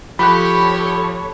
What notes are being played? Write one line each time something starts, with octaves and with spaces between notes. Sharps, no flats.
F3 G4 A4 C#5 B5 F#6